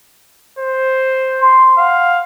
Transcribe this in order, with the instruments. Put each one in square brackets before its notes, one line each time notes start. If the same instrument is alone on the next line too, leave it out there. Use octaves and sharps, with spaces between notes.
[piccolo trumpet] C5
[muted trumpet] C6
[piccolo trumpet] F5 [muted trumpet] F#5